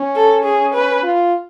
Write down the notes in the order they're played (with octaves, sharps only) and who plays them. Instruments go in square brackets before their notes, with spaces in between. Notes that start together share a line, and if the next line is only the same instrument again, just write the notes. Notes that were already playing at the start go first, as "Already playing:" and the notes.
Already playing: [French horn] C#4
[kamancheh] A4
G#4
B4
[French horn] F4